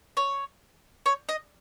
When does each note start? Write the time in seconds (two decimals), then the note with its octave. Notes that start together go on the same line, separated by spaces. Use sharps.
0.17 C#5
1.06 C#5
1.29 D#5